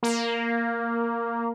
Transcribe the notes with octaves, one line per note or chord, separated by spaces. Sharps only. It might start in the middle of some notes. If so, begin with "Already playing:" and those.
A#3